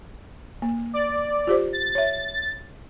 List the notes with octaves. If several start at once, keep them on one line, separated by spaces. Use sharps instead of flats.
A#3
D5
F4 G4 C5
A6
C#5 E5